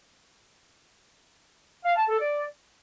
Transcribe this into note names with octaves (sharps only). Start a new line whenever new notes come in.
F5
A5
A4
D5